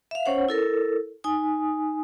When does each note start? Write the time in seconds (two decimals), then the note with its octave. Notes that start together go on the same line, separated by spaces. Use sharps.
0.11 E5 F5
0.26 C#4 C5 C#5 F#5
0.49 E4 A4 A#4
1.24 D#4 G#5 D#6